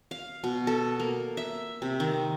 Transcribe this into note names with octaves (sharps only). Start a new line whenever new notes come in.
F5
B2
A4
A#3
E5
C3
D#3